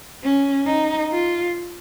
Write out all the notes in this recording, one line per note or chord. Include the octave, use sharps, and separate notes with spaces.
C#4
D#4
F4